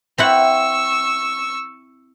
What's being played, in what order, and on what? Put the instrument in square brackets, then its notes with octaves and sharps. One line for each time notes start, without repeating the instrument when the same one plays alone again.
[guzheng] C4 E4 F#5 [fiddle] C#6 E6